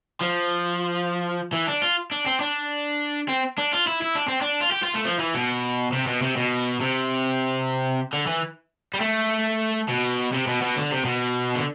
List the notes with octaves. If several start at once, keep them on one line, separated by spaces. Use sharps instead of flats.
F3
E3
D4
F4
D4
C4
D4
C4
D4
F4
E4
E4
D4
C4
D4
F4
G4
F4
A3
F3
E3
B2
C3
B2
C3
B2
C3
D3
E3
G3
A3
B2
C3
B2
B2
D3
C3
B2
D3